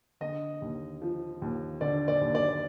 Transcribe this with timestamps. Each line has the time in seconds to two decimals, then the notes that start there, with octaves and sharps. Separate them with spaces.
0.20 D3 D#5
0.62 D#2
1.02 F3
1.42 D#2
1.81 D3 D5
2.08 D5
2.21 D#2
2.35 D5